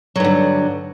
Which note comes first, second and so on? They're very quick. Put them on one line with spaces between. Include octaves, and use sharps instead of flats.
F#3 G2 D3